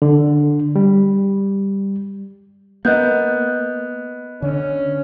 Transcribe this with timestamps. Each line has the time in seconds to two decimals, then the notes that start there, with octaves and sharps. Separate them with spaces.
0.02 D3
0.76 G3
2.85 A#3 B3 D#5 F#6 G6
4.42 D3 C#4